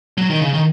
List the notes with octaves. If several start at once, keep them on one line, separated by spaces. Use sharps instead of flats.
F#3
D#3
C#3
D#3